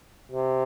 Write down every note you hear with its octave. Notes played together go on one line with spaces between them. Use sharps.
C3